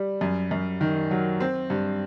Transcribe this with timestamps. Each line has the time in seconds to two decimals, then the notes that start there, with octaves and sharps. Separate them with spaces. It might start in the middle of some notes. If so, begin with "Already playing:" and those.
Already playing: G3
0.21 F#2
0.51 F#2
0.81 D#3
1.11 F#3
1.40 C4
1.70 G2